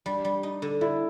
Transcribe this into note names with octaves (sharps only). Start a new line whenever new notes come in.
G3 D4
G3
D#4
D3
D3 E4